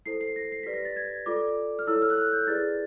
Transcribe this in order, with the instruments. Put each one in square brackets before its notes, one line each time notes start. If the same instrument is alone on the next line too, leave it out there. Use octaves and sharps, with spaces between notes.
[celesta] E4 A4 C5 C7
C7
A#6
C7
G4 B4 D5 B6
A#6
A6
G#6
F4 A4 D5 D6
F6
E4 A4 C#5 E6
F6
F#6
F6
G6
E4 G#4 B4 D5 A6